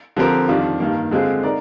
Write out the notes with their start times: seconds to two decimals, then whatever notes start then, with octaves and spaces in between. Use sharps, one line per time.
0.17 D3 F3 C4 G4 A#4
0.48 F2 D#3 G3 D4 F4
0.80 G2 D#3 A#3
1.11 D3 G#3 C4 F4 G#4
1.43 D#4 A#4 D5